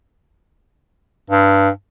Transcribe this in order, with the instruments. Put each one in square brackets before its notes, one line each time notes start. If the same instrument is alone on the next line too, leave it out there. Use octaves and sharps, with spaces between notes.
[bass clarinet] G2